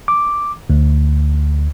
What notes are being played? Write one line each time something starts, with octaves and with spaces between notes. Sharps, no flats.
D6
D2